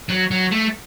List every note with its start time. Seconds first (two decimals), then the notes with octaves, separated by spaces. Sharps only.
0.09 F#3
0.31 F#3
0.52 A3